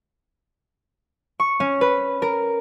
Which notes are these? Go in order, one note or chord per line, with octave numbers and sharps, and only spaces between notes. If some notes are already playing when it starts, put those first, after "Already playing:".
C#6
C#4
B4
A#4